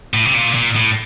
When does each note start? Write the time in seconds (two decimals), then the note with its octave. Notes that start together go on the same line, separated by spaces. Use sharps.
0.14 A2
0.26 C3
0.34 A#2
0.55 A#2
0.75 A2